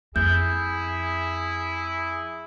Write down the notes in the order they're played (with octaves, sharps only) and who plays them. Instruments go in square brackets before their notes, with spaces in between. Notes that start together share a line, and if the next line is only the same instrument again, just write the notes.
[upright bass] F2 [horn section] E4 [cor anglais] G#4 [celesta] G6